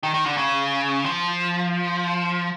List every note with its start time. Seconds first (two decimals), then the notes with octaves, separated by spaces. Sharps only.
0.03 D#3
0.14 D#3
0.26 D3
0.37 C#3
1.06 F3